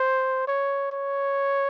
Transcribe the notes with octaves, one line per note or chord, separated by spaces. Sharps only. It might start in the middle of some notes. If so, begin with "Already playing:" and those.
Already playing: C5
C#5
C#5